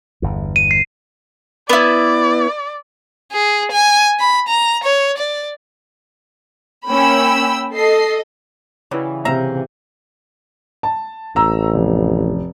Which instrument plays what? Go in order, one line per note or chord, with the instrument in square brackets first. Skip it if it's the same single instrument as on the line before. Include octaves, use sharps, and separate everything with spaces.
[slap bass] G1 E2
[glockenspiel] D#7
C7
[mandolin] B3 E4 [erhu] D5
[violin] G#4
G#5
B5
A#5
C#5
D5
[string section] A#3 C#4 [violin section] G5 B5 E6
[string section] A4 D#5 [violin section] C7
[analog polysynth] C#3 E3 [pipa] F#3 G3
[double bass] C3 [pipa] E5 F5 A#5
[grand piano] A5
[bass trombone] A1 [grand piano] A#5 E6
[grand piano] F1